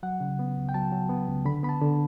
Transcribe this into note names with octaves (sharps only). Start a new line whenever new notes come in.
F#3 F#5
C#3
B3
C#2
G5
F#3 A5
F#3
B3
C#2
D3 B5
B3 B5
A5
D3